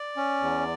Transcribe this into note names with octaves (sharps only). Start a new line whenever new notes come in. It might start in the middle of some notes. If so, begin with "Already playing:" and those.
Already playing: D5
C#4
E2